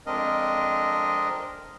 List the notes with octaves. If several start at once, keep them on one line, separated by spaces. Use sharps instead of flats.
F2 G#3 C4 D4 A#4 D#5